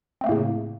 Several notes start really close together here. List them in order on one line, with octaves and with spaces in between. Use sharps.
C4 A3 A#3 A2 C#3